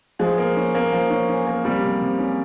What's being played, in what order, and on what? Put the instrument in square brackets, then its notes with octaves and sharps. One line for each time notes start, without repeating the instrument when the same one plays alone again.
[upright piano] F3 [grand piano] G#3
[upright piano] A#3
C#4
A#3
F3
C#4
C#4
A#3
[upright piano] C3 [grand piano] G3
[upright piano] C3
C3
C#4